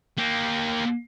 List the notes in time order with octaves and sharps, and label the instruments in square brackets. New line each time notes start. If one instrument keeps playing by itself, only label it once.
[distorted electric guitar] A#3 G4